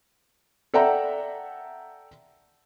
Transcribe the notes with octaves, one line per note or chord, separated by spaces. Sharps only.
A4 D5 E5 F#5 G5 A#5